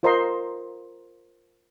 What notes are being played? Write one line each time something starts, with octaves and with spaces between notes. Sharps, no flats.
F4 A#4 C5 D#5 A#5 C6